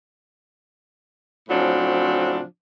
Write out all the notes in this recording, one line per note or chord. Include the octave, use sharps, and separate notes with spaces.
A2 C#3 F3 F#3 C4 D4